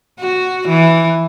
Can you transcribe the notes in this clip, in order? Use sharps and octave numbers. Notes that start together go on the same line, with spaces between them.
F#4
E3